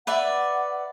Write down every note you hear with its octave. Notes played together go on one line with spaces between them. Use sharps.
B4 D5 E5 F#5